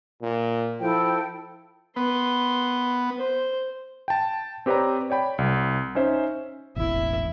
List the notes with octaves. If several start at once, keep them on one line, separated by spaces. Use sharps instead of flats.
A#2
F3 E4 A4 G5
B3 B4 C6
C5
G5 A5
C4 G4 B4 C#5 D5 A#5
C#5 D5 G5 B5
C2
C#4 D#4 C5 E5
E1 A1 E4 E5